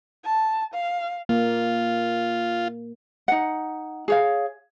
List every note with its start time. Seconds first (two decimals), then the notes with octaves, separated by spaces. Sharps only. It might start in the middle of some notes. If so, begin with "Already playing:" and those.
0.25 A5
0.74 F5
1.29 A#3 F4
3.28 D#4 F#5
4.08 G#4 C#5 F5